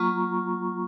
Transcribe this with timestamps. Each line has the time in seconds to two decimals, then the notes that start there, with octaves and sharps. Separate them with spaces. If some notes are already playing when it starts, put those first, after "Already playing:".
Already playing: F#3 A#3 F4 A#5 C#6